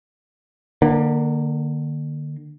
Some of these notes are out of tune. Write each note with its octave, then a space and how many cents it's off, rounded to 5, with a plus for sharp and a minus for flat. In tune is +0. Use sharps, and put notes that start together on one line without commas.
D3 +30 A#3 +0